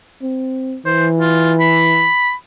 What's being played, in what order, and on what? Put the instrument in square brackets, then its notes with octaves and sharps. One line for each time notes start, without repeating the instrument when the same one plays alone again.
[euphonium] C4
[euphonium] E3 [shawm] C5
[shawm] F4
B5